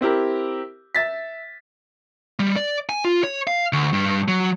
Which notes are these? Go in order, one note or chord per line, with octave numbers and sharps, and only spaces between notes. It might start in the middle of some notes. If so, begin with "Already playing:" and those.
C4 E4 G4 A#4
E5 A6 B6
G3
D5
G#5
F4
C#5
F5
D2
G2
F#3